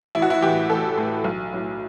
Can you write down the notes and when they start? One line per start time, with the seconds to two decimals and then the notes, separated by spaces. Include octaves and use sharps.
0.15 A1 E4
0.22 F#4
0.30 E4
0.42 A2 E3 G4
0.70 A1 A4
0.97 A2 E3
1.24 B1
1.53 A2 F#3